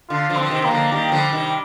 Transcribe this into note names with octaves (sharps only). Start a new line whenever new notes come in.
D3 F4
D3 F3
C4
F3
C3 D#3
D#3 A#3
D3 F3
D#3 G3 A#3
D3 F3
G3
C3 D#3
G3